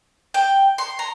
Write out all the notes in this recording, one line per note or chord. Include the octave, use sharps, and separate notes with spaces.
G5
C6
A#5